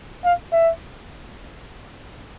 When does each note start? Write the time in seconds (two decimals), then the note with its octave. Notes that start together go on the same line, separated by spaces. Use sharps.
0.24 F5
0.53 E5